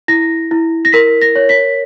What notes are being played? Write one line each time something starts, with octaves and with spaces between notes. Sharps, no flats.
E4 A#6
E4
A#6
A#4 B6
A#6
C#5
B6